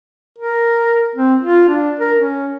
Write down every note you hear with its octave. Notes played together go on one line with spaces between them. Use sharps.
A#4
C4
F4
D4
A#4
C#4